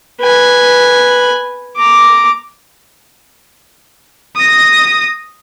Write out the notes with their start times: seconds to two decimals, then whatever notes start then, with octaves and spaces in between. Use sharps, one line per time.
0.21 B4 G#5
1.76 A#5 D6
4.36 D#6 A#6